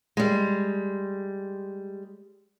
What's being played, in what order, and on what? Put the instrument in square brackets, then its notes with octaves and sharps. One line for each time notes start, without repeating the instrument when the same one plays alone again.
[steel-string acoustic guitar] G3 G#3